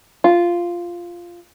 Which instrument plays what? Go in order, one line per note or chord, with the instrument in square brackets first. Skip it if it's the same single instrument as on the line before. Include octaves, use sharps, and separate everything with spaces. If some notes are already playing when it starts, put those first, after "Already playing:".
[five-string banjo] F4